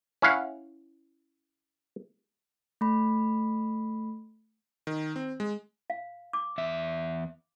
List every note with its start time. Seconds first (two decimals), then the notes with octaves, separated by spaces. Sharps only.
0.22 C#4 E4 F5 F#5
2.81 A3 B5
4.87 D#3
5.16 C4
5.40 G#3
5.90 F5
6.33 D6
6.58 E2 E5